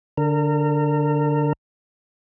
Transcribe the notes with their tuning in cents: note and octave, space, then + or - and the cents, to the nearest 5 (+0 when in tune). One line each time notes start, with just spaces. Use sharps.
D3 +0 A#4 -30